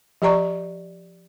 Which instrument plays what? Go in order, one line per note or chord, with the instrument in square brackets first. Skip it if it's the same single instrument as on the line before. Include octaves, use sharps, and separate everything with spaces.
[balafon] F3 G4 D5 A#5 C#6